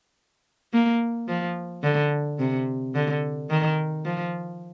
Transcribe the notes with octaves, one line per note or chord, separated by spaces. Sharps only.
A#3
F3
D3
C3
D3
D#3
F3